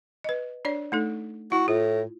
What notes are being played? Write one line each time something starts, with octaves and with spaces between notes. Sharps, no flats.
B4 D#5
D4 C#5 D5
A3 D#4 A4
E4 F#4
A2 F4